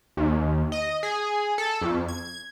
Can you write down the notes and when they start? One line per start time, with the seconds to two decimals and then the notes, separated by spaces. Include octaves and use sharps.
0.17 D#2
0.72 D#5
1.03 G#4
1.58 A4
1.82 F2
2.08 G#6